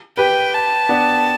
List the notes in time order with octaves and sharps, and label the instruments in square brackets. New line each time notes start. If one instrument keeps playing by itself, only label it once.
[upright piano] G4 B4 [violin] G5
[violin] A5
[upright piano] B3 D4